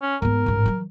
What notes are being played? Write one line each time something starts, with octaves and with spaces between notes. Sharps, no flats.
C#4
G#2 B3 A#4
A1 G#2
E3 F#3